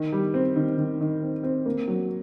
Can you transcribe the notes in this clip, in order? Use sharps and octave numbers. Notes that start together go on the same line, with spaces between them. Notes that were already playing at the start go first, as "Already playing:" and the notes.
Already playing: D#3
G3
C4
D#3
D#3
D#3
C4
C4
A#3
F#3